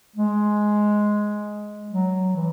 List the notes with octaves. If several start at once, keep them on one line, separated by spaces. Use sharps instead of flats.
G#3
F#3
E3